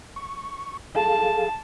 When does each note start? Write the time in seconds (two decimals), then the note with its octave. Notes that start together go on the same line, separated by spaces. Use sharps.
0.16 C#6
0.96 G#4 A4 F5 A5